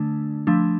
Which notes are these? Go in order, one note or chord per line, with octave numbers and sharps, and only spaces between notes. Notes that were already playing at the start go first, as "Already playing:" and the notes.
Already playing: D3 A3 D4
F3 A3 D4